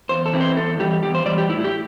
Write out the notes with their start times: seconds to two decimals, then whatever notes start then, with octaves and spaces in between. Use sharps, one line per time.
0.09 E2 C5
0.26 A4
0.33 E3 C4 E4
0.41 C5
0.57 E2 A4
0.80 E3 G3 G4
1.03 E2 G4
1.15 C5
1.26 E3 G3 D5
1.38 G4
1.49 A2 E4
1.60 E4
1.64 G4